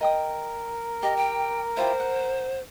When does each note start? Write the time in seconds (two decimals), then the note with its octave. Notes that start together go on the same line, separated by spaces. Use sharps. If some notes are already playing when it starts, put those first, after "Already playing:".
0.01 A#4 D#5 G5 D#6
1.03 G4 D#5
1.17 G5
1.77 E4 F4 G4 C5
2.00 F#5